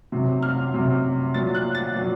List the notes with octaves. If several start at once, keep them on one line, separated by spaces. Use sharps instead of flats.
C3 F#3
F6
C3 F#3
A#2 F#3 A6
F#6
A6
A#2 F#3